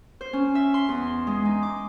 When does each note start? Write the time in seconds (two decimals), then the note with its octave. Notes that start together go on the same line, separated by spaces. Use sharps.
0.21 C5
0.33 C#4
0.55 E5
0.74 C6
0.89 E2
1.27 G#3
1.45 D#4
1.63 D6